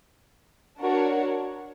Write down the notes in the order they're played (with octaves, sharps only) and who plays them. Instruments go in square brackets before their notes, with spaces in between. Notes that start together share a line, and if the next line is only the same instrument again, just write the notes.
[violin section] D4 F#4 A#4 C#5